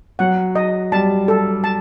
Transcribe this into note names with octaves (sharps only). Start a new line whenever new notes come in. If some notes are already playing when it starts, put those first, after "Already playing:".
F#3 F#5
D#5
G3 A5
A4
A5